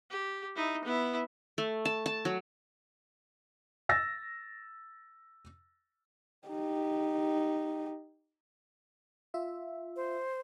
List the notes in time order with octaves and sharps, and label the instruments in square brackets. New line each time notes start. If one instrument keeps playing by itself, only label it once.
[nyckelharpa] G4
D#4 E4
B3 E4
[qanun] A3
A5
A5
F#3
[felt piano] E6 A6 A#6
[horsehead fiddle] D#4 G4
[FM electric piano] F4 E5
[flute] C5